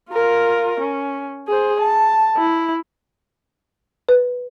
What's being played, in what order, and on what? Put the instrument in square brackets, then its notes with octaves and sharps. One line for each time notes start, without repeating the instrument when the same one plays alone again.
[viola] F4 A#4
C#4
G#4 C5
A5
E4
[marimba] B4